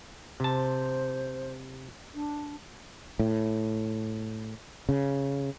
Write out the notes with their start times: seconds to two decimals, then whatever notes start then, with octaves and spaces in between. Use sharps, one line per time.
0.40 C3 C5 A5
2.14 D4
3.19 A2
4.89 C#3